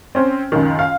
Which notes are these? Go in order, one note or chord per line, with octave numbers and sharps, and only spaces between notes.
C4 C#4 C5
C#2 F#2 D#3
F5